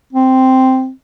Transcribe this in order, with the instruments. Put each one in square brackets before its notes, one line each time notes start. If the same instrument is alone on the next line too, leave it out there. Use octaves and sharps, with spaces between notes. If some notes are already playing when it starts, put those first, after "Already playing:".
[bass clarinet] C4